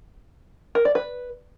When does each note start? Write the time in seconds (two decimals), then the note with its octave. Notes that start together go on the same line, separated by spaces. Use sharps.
0.75 A#4
0.85 D5
0.95 B4